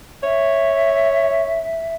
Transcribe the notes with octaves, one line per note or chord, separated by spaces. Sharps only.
C#5 E5